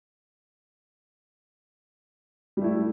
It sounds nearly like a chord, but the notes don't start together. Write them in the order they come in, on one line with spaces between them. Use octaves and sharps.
G3 A3 E4